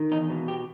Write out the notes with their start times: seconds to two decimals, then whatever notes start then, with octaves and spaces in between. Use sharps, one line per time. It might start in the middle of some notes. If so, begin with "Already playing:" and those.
Already playing: D#3
0.11 E2 D#4
0.30 B2
0.48 G4